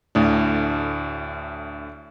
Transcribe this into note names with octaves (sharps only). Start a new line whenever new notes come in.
D2 A2 D4